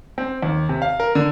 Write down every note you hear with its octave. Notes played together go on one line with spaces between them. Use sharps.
C4
D#2
C3
F5
A#4
D3